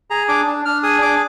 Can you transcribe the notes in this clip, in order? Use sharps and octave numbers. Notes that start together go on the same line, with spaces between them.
G#4 A#5
D4 D6
D4
D4 F6
G#4 D#6
D4 D6